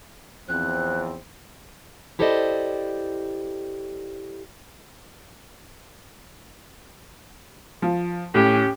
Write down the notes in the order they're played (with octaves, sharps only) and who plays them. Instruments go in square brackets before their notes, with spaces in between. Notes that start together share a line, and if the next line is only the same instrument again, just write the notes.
[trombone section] E2 F3 C4 [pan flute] F#6
[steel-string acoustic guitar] E4 G4 A4 C5 D5 D#5
[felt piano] F3
[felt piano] A2 [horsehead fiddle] C#4 G4